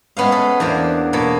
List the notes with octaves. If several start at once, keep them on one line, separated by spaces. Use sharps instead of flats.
G#3 A3 B3 C#4 F5
G#3 A4
E2 E3 A#3 D4 C5
B2 A#3 A4 C#5